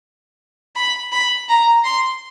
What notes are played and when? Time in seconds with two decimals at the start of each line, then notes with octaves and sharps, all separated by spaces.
0.76 B5
1.12 B5
1.49 A#5
1.84 C6